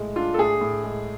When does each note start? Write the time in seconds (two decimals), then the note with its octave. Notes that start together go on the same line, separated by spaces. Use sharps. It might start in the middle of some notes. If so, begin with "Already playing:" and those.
Already playing: A2 G#3
0.16 D4 F4
0.34 A4
0.38 A2 G#4
0.61 A2
0.84 G#3